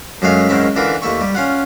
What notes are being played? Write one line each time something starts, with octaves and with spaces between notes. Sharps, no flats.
F#2 F#3 G#3 A3 F5
G#2 D#3 G#3 C4 C#4 E4
D3 E3 F4 A#4 B4
D#2 A3 E4 C#6
G3
C#4 F4 F#5